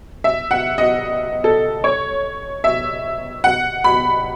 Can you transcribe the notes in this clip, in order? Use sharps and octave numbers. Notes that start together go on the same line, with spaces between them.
E5
F#5
D#5
A4
C#5
E5
F#5
B5